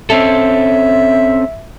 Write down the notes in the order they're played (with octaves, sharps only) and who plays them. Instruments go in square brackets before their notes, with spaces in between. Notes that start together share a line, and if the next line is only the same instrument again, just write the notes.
[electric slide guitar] C4 C#4 A4 [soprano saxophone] E5